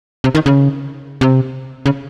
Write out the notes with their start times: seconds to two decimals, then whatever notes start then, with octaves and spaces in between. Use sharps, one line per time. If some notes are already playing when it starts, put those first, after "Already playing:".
0.24 C3
0.35 D#3
0.46 C#3
1.21 C3
1.86 C#3